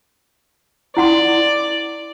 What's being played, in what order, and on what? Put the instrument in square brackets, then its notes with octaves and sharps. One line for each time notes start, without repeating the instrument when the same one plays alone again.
[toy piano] E4 F#5 C6 [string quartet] D5